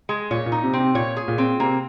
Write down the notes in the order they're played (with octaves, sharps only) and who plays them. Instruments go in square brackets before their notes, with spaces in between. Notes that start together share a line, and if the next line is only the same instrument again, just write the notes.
[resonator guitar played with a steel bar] G#3
[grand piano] A#2 [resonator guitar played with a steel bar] C#5
[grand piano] A#2
[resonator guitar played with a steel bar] D#4
[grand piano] C3
[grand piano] C3 [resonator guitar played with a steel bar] C4
[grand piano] A#2 [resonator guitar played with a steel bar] C#5
[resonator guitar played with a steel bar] G#4
[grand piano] A#2
[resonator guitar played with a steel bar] C4
[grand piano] C3 [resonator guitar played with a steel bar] A#3